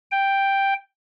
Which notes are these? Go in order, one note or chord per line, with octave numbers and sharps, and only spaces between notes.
G5